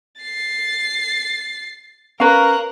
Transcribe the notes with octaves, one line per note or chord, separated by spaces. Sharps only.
A6 C7
C#4 A#4 B4 F5 A#5 F#6